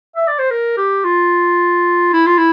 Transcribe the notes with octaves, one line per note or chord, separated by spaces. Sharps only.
E5
D5
C5
A#4
G4
F4
E4
F4
E4